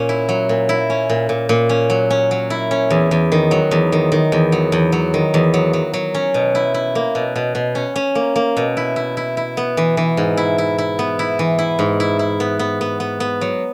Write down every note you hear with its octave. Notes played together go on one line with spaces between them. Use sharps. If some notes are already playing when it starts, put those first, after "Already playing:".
Already playing: A#2 C#4
E4
F#3
A#2
E4
C#4
A#2
A#2
A#2
C#4
F#3
C#4
F#3
E4
C#4
E2
E2
D#3
F#3
E2
D#3
D#3
E2
F#3
E2
F#3
D#3
E2
F#3
F#3
F#3
C#4
B2
E4
E4
A#3
B2
B2
B2
C#4
C#4
A#3
A#3
B2
E4
E4
E4
E4
B3
E3
E3
G#2
E4
E4
E4
B3
E4
E3
E4
G#2
E4
E4
B3
B3
B3
B3
B3
F#3